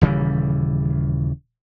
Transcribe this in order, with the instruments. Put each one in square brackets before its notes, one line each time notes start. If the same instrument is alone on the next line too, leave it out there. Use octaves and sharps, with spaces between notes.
[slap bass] D#1 C#3 E3 G3